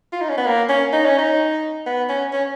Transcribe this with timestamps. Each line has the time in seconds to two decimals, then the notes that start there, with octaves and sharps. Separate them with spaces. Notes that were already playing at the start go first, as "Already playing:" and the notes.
0.13 F4
0.21 D#4
0.29 C#4
0.38 B3
0.46 A#3
0.69 C#4
0.93 D#4
1.05 C#4
1.18 D#4
1.86 B3
2.09 C#4
2.33 C#4